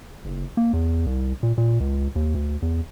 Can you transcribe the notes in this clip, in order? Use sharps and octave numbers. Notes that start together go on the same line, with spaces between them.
F#1
A#3
E2
C2
A#2
A#2
C#2
D#2
D2
E2